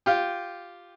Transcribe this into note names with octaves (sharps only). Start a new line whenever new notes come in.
F4 G4